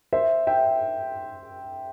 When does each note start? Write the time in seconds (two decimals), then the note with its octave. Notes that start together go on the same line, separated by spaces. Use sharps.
0.13 C5 E5
0.47 E5 G5